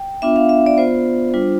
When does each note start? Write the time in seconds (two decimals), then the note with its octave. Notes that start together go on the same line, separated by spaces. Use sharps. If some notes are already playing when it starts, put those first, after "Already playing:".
Already playing: G5
0.22 B3 D4 F4 E5
0.36 F5
0.49 E5
0.66 D5
0.77 B3 F4 C5
1.34 G3 D4 F4